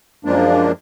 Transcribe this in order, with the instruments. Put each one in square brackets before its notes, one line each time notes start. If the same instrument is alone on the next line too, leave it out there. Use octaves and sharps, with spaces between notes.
[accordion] F#2 F3 G#3 A#3 D4